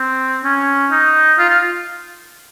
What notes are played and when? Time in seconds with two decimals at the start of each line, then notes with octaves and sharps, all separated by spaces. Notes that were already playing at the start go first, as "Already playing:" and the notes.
Already playing: C4
0.44 C#4
0.91 D#4
1.38 F4
1.49 F4